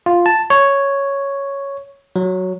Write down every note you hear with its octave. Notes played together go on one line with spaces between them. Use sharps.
F4
A5
C#5
F#3